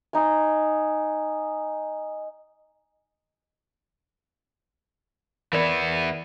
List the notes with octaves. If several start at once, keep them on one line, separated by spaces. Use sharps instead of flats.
D#4 G#5
E3 B3 A#4 D5 B5